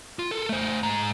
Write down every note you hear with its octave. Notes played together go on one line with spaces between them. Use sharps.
F4
A4 A#4
A3 C5
G#2 A#5